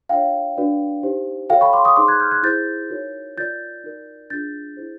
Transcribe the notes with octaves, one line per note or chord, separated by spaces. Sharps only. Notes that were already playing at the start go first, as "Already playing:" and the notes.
D4 F4 G#4 C#5 F5 G5
D4 F#4 B4 D5
D#4 G4 C5
F#4 A4 C#5 F5 G5
B5 C#6
C6 D6
C#6 D#6
D#4 G#4 C5 C6 D6
F#6 G#6
F6 G6
F#6 G#6
E4 G#4 C5 G6 A6
D#4 F#4 A#4 C#5
F4 A#4 D5 G6 A6
D#4 F#4 A#4 D5
D4 F4 G#4 G6 A6
E4 G#4 C5